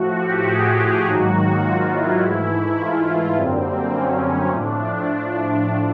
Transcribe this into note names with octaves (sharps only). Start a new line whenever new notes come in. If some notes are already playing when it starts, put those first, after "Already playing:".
Already playing: A2 F3 A3 F#4
G4
G#4
G4
G#2 D#3 F#3 A#3 F#4
F4
E4
G#2 E3 A3 E4
F4
F#2 D3 G3 A#3 C4
C#4
C#4
A2 F3 A3 D4
D4